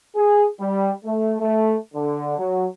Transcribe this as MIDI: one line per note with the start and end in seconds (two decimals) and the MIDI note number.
0.15 0.46 68
0.60 0.90 55
1.04 1.35 57
1.40 1.75 57
1.94 2.37 50
2.38 2.66 54